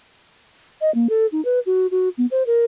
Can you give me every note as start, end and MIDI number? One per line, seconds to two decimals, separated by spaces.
0.81 0.93 75
0.95 1.07 58
1.09 1.27 69
1.32 1.43 63
1.45 1.60 71
1.66 1.87 66
1.91 2.09 66
2.18 2.26 59
2.31 2.43 72
2.47 2.65 70